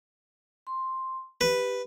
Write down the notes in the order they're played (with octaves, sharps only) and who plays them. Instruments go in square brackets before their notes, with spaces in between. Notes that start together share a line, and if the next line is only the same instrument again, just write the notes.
[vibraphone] C6
[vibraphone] G4 [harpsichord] B4